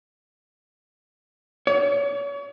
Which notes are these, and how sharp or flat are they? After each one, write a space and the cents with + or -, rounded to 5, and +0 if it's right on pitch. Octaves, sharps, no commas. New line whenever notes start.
C#5 +35